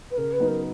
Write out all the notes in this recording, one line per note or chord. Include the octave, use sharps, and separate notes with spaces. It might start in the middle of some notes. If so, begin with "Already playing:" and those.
B4
C#3 A#4
B4
F#3 B3 D#4 F#4
A#4